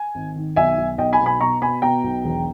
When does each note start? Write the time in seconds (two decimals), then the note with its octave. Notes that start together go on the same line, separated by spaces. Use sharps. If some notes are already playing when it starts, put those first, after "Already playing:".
Already playing: G#5
0.15 G#1
0.35 D#3
0.56 B1 E5 G#5
0.78 B1
0.98 B1 D#5 G5
1.13 G#5 B5
1.20 B2
1.26 G#5 B5
1.41 B2 A#5 C#6
1.62 B2 G#5 B5
1.82 B2 G5 A#5
2.03 B1
2.24 E1